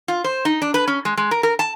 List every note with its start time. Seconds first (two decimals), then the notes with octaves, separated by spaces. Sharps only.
0.08 F4
0.24 C5
0.45 D#4
0.62 D4
0.74 B4
0.88 C#4
1.05 G#3
1.17 G#3
1.31 A#4
1.43 A#4
1.59 A5